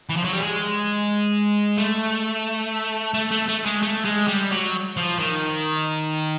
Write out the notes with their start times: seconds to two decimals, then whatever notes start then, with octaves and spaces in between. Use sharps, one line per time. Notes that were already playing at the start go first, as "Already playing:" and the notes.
0.10 E3
0.17 F3
0.25 F#3
0.33 G3
0.41 G#3
1.78 A3
3.14 A3
3.31 A3
3.48 A3
3.66 G#3
3.83 A3
4.05 G#3
4.28 G3
4.51 F#3
4.97 F3
5.19 D#3